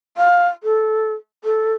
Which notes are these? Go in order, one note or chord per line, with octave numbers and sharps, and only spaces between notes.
F5
A4
A4